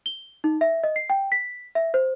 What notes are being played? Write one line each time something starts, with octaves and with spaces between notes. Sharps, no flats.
G7
D#4
E5
D#5
C7
G5
B6
E5
C5